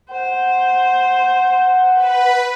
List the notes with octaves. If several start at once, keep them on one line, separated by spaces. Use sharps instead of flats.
C5 F#5
B4